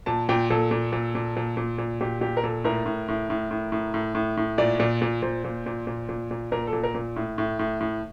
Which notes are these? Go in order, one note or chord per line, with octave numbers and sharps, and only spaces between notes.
A#2 A5
A#2 G5
A#2 A4
A#2
A#2
A#2
A#2
A#2
A#2
A#2 G4
A#2 G4
A#4
A#2 A4
A2 A#4
A2
A2
A2
A2
A2
A2
A2
A2
A#2 D5
A#2
A#2
A#2 C5
A#2
A#2
A#2
A#2
A#2
A#2 A#4
A4
A#2
A#4
A#2
A2
A2
A2
A2